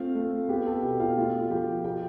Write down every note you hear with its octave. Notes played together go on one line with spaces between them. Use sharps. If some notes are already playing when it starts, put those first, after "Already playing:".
Already playing: A3 C4 F4 F5
A3
B3 G4
A4
B2 G4 G5
F4 F5
A3 F4 F5
F3 G4 G5
B2 G4 G5